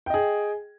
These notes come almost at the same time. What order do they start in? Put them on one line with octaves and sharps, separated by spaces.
G5 D#5 G#4